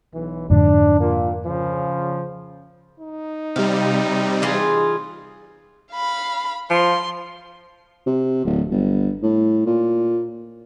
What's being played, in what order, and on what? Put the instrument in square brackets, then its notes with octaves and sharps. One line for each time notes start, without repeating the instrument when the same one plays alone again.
[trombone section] B1 E3
[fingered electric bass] F2 G#2 D3 [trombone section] D4
[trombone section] A#2 A#3
C#3 F3
[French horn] D#4
[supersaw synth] C3 G3 [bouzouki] F5
[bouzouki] E3 F4 G#4
[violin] F5 B5
[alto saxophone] F3 [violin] C6
[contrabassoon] C3
D1
G1
A2
A#2